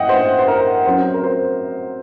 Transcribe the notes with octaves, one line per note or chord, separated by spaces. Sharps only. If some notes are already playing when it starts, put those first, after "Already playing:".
Already playing: A2 A#3 D#5 F#5 G5
C5
C5
A#4
F#2 F#3 C4 C5
A#4
C5